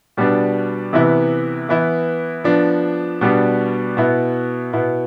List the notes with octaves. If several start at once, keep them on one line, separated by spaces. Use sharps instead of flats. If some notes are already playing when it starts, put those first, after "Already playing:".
B2 G3 B3 D4
C3 E3 B3 E4
E3 B3 E4
F3 B3 D4
B2 G3 B3 D4
B2 B3 E4
B2 B3 E4